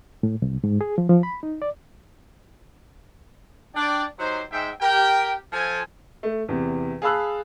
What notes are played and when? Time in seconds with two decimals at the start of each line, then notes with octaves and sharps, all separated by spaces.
0.23 A2
0.42 C2
0.64 G#2
0.81 G#4
0.98 F3
1.09 F3
1.23 B5
1.43 D#4
1.62 D5
3.75 D4 D5 G5
4.19 F#3 D#4 G4 C5
4.51 G#2 G#3 E5 G5
4.81 G4 A#4 G5
5.52 F3 A4 G#5
6.23 A3
6.49 E2 C3
7.02 G#4 F5 A5 B5 E6 F#6